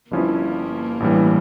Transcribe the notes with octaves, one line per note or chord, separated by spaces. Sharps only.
G1 G2 F3 A#3 C#4 E4
A1 G2 E3 G3